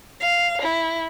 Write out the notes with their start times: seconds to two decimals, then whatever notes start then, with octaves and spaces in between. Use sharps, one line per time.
0.20 F5
0.62 E4